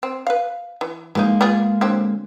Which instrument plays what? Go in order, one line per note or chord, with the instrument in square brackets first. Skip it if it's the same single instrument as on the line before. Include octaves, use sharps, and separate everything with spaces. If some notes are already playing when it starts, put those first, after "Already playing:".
[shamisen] C4
B4 F5
E3
[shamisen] E3 D#4 [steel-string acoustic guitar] G#3 A#3
[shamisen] B3 F4 G#4
D3 F#3 C4